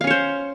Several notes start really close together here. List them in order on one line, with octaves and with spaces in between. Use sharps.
F5 C#4 C#5 C5